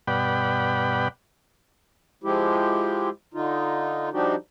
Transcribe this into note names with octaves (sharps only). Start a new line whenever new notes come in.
G2 B2 D5 F#5 G5 B5
F3 G#3 E4 G4
D3 D#4 F4
F3 G3 D4 D#4 F#4 G4